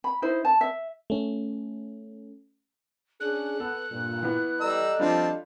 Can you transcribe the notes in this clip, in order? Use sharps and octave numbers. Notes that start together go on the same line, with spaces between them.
B5
D#4 E4 C5
A5
E5
A3 C#4
C#4 D4 G#4 F#6
B3 A4
G2 A#2
E3 B3
G3 A4 D5 D#5 A#5 E6
F3 G3 C4 D4 F4 A5